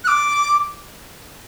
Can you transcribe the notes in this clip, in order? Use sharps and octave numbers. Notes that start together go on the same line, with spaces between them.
F#6
D6